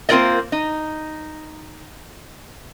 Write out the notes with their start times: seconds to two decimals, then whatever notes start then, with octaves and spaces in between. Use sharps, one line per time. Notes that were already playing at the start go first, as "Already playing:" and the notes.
0.09 A#3 C4 F4 A#4 D5 D#5
0.52 D#4